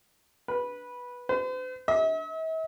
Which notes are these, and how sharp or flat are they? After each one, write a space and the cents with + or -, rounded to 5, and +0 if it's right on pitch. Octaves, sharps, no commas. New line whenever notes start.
B4 -10
C5 -45
E5 -45